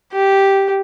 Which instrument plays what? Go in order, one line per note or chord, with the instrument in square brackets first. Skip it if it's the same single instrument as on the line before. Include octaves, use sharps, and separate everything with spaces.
[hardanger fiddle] G4